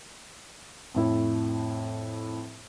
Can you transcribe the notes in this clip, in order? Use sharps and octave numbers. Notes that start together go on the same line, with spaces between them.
F2 A2 E4